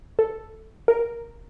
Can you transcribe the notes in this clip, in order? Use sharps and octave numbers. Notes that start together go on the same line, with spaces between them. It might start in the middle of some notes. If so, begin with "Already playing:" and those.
A4
A#4